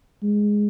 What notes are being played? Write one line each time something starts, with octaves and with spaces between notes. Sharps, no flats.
G#3